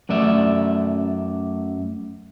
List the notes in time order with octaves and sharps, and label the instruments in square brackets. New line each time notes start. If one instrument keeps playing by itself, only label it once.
[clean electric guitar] F#2 A3 D5 E5